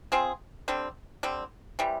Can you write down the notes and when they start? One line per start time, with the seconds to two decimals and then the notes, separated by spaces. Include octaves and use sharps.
0.12 C4 F4 G#4
0.68 D3 G3 C4
1.23 D3 G3 C4
1.79 C3 E3 G3